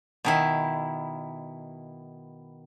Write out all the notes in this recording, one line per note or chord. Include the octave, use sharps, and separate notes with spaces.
B2 D#3 E4